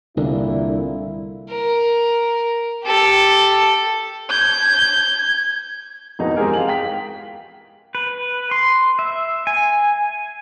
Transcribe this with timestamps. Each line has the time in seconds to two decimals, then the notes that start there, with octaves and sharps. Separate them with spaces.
0.17 C2 A#2 D3 A#3 E4
1.50 A#4
2.84 G4 A4
4.30 G6 G#6
6.19 E1 F2 E3 G#3 D#4 F#4
6.36 G#3 C4 G4 G#4 A#4
6.53 F5 F#7
6.68 G5 B6
7.95 B4
8.51 C6
8.99 E5
9.47 G#5